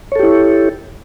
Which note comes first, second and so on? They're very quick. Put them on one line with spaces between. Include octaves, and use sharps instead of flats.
C#5 A4 G4 E4